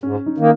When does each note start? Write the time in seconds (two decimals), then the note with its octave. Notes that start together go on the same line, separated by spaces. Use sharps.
0.03 G#2 C#4
0.26 D#4
0.38 D#3 A#3